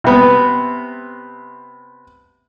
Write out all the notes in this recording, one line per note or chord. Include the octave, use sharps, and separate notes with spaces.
C3 B3